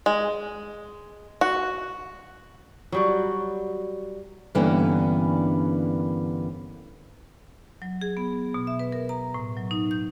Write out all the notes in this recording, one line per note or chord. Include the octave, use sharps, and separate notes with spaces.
G#3
F#4
F#3 G3 F#4
G2 D3 E3 A#3 B3 C#4
F#3
G#4
B3
B2
E5
B4
A#4
A#5
A2
F#3
D#4
G6